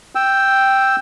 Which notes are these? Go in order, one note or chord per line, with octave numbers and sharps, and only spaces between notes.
G5 E6